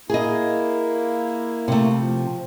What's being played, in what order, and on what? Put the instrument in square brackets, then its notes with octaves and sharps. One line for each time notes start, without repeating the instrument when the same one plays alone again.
[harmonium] A#3 E4 [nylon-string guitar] G#4 D#5
[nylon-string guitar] C3 A3
[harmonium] F3